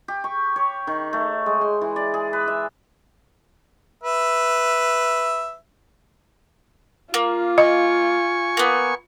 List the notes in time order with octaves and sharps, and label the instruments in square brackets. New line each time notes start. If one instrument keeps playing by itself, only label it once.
[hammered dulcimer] G4
C#6
C#5
D#3
A3
G#3
C6
E3
D5
G#4
B4
E5
[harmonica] B4 E5
[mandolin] A#3 [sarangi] F4
[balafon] D#5 [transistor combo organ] G#5 C#6
[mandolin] A#3 B3